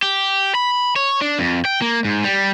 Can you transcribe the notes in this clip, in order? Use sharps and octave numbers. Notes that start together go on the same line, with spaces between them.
G4
B5
C#5
D4
F2
G5
A#3
G#2
G3